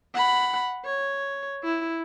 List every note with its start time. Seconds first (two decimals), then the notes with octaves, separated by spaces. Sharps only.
0.15 F#5 B5
0.85 C#5
1.64 E4